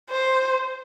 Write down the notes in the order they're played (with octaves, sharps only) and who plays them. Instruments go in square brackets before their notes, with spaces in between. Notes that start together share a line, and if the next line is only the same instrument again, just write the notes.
[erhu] C5